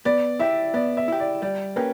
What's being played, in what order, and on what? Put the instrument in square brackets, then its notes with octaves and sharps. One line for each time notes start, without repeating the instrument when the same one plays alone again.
[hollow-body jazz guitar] B3 [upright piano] D5
[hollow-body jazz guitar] E4 G4 [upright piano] E5
[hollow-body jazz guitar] B3 [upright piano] D5
[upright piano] E5
[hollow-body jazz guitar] E4 G4
[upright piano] D5
[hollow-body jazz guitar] G3 [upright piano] D5
[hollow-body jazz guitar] A#3 C#4 G4 [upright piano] B4